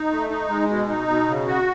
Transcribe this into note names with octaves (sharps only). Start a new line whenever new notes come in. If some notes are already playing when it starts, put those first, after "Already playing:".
Already playing: D#4
A3
D#4
G#3
B2
D#4
B2
C#3
F#4